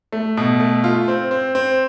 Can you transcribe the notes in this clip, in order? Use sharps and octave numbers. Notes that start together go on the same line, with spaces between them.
A3
B2
A3
F4
C4
C4
C4